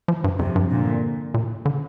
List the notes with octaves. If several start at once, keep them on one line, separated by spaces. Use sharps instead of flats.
F3
G2
F2 C3 F3
G2
A#2 D3
A#2
D3